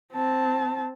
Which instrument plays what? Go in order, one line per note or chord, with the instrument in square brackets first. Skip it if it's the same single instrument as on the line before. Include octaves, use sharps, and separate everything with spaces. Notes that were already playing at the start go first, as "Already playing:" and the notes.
[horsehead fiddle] C4 A5